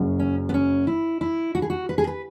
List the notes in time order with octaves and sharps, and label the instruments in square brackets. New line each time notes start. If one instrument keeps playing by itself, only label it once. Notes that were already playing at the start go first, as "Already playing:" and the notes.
Already playing: [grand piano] F#1 F#2 F#3
[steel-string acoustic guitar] C#4
B3
C#4
E4
E4
F#4
G#4
F#4
B4
G#4
B4